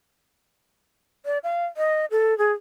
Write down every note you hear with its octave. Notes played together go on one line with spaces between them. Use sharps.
D5
F5
D#5
A4
G#4